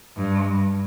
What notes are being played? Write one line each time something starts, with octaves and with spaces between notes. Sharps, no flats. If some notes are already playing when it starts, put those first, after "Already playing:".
G2